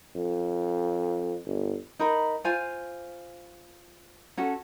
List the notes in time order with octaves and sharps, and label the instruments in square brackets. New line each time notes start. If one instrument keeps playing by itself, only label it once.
[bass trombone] F2
G1
[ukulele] D#4 A#4 B5
F4 C5 F5 G#5
C#4 F#4 A4